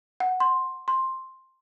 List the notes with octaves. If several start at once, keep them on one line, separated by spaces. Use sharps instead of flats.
F#5
C6
C6